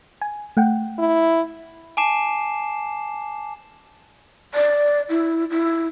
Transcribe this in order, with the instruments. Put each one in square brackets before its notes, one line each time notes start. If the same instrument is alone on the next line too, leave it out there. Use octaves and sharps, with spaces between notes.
[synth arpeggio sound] G#5
A3 F#5 G5
[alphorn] E4
[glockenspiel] G#5 A5 D6 C7 E7
[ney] D5
E4
E4